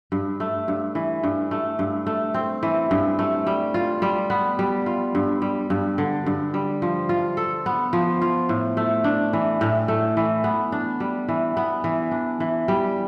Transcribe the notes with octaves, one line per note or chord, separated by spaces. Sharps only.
G2
A3
G2
E3
G2
A3
G2
A3
C4
E3
G2
A3
G3
F4
G3
B3
G3
F4
G2
G3
G2
D3
G2
G3
F3
F4
A4
B3
F3
F4
A2
A3
D4
E3
A2
A3
E3
B3
D4
G3
E3
B3
E3
D4
E3
G3